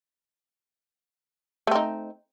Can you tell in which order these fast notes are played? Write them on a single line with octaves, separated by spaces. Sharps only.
A3 C4 D#4